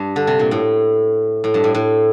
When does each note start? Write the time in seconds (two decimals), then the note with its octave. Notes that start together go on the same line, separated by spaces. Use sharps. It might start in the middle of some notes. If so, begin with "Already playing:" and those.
Already playing: G2
0.16 D3
0.27 C3
0.39 A#2
0.51 A2
1.44 A2
1.54 G2
1.64 A2
1.75 A2